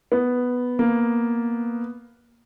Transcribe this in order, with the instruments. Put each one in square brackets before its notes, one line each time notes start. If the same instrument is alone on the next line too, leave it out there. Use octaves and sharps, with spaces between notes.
[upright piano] B3
[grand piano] A#3